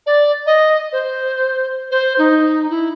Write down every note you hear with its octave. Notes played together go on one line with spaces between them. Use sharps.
D5
D#5
C5
C5
D#4
E4